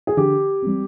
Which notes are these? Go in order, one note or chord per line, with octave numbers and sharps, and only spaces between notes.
G#4
D3 G4
G3 C4